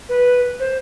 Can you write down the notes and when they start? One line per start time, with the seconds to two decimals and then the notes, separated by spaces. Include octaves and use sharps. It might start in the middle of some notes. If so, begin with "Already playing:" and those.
0.09 B4
0.60 C5